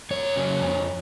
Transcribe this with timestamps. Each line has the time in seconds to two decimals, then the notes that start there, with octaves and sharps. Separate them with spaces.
0.11 F2 C#5
0.36 C#3 F#3 A#3
0.61 F2